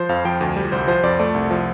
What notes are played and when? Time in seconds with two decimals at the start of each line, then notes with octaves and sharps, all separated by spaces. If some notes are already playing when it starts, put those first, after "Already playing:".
Already playing: F3 C5
0.09 F2 F5
0.25 F3 G5
0.41 D2
0.56 G3
0.72 C2 C5
0.88 F3 C5
1.03 F2 D5
1.19 A3 D5
1.34 C2
1.51 F3